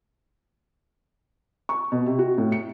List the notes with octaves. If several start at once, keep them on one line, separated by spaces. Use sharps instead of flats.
C#6
B2
C3
F#4
A2
C#7